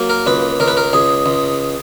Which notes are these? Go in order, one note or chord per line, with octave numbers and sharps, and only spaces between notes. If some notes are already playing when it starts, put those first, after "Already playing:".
Already playing: F#3 A#3
A#4
C#2 B4
C#2 A#4
B4
A#4
C#2 G#4
C#2